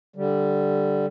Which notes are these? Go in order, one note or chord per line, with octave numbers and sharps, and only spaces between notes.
D3 G3